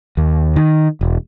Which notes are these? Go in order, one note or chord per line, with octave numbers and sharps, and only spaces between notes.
D#2
D#3
E1